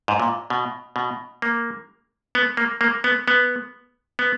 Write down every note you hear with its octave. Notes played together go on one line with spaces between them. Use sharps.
G#2
A#2
B2
B2
A#3
B3
A#3
A#3
B3
B3
B3